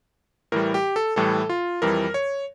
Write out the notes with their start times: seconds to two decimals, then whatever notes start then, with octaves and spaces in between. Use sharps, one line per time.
0.52 A2 E3 G3 A#4
0.74 G4
0.96 A4
1.16 A2 E3 G3 A4
1.49 F4
1.82 F2 E3 G3 A#4
2.14 C#5